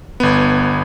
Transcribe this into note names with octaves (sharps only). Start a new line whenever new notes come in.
G1 B3